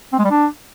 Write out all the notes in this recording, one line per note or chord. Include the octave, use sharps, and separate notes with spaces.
C4
G#3
G3
D4